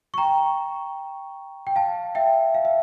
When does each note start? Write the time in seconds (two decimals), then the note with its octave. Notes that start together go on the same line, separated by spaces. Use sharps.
0.14 C#6
0.18 G5 A#5
1.67 G5
1.76 F5 A5
2.15 E5 G5
2.54 F5
2.65 E5